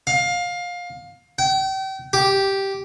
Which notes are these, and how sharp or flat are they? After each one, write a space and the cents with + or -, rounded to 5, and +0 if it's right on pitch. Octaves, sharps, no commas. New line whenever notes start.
F5 +20
G5 -35
G4 -5